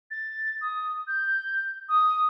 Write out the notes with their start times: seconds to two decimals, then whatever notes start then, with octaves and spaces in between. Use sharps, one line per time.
0.11 A6
0.61 D#6
1.08 G6
1.89 D#6